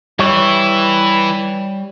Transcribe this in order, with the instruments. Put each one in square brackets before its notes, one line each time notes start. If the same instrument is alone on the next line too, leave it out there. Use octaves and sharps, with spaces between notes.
[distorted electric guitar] E3 E4 [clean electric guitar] G3 C#5